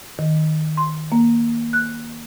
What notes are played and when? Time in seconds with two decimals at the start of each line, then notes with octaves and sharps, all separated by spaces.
0.19 D#3
0.77 C6
1.12 A#3
1.73 F#6